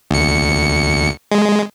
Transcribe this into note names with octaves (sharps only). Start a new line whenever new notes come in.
D2 C#7
G#3